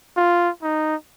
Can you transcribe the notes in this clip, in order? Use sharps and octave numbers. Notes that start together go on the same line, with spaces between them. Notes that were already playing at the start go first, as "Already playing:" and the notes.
F4
D#4